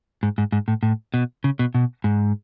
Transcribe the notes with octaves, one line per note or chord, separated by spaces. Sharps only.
G#2
G#2
G#2
A2
A2
B2
C#3
B2
B2
G#2